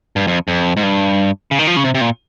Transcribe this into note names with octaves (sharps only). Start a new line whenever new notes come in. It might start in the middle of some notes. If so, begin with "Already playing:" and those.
G2
F2
F2
G#2
G2
C#3
D#3
F3
C#3
C3
C3
A#2